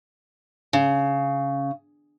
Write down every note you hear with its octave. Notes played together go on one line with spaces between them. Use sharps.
C#3